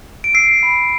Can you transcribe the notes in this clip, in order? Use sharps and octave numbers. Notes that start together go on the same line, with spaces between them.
D7
E6 C7
B5